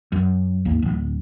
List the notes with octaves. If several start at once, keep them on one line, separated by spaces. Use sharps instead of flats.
F#2
G#1 D#2 A#3
D1